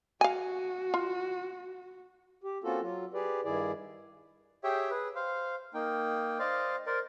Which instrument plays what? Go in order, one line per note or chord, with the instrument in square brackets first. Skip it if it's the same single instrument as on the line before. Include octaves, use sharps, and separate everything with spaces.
[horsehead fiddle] F#4 [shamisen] F5 G#5
[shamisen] F4
[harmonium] G4
A#3 C4 C#4 F4 F#4 A4
F#3 F4
G4 G#4 B4 D5
G2 D#3 E4 G#4 D5
[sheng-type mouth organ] G4 G#4 C#5 E5 G5
G#4 B4
C5 F5
A#3 D#4 G5
C5 D5 D#5 F5
A#4 C5 D5